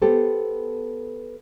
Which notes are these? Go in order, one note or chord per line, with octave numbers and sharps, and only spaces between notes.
B3 G4 A4 C5